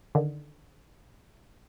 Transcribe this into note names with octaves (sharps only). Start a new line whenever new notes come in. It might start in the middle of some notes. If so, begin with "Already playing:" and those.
D3 D#3